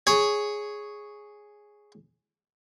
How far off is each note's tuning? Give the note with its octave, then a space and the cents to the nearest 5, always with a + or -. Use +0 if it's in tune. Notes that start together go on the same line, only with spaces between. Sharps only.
G#4 +0 C#5 +0